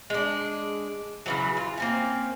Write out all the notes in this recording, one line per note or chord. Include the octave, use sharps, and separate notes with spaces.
G#3 D4
C#3 E3 F#3
F4
A#3 C4 C#4